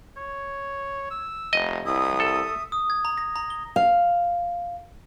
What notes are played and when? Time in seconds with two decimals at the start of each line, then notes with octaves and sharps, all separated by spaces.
0.17 C#5
1.11 E6
1.53 F1 D#5
1.85 C2 E4 D#6
2.20 A4 E5
2.72 D#6
2.90 G#6
3.05 A#5
3.18 A#6
3.36 A#5
3.50 G7
3.76 F5